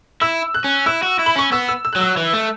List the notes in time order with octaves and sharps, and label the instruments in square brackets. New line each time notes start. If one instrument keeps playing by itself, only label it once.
[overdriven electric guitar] E4 [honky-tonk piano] E6
[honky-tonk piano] F#6
[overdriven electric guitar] C#4
[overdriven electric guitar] E4 [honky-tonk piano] E6
[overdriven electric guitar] F#4
E4
[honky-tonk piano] B5
[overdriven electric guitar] C#4 [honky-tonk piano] C#6
[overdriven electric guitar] B3 [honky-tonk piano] E6
[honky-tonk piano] E6
E6
F#6
[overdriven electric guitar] F#3 [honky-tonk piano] E6
[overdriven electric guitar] E3
A3